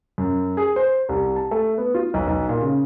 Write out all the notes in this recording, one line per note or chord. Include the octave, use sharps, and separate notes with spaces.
F#2
G#4
C5
C2
A5
A3
B3
F4
B1
B1
A#2
C#3